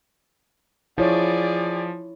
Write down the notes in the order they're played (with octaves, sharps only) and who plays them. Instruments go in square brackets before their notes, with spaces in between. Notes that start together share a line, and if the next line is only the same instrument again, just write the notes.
[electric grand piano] F3 [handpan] E4 C#5 [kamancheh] G#4 D5